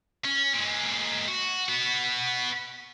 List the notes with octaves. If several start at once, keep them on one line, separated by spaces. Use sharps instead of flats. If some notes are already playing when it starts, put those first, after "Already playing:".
C#4
A#2 G#3
F#4
B3 F#4